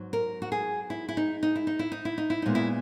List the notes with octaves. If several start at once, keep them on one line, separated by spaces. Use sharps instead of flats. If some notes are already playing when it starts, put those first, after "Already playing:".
Already playing: G#2 F#3 B3
A#4
F#4
G#4
E4
E4
D#4
D#4
E4
D#4
E4
D#4
E4
D#4
E4
A#2 G#3 B3 D#4
E4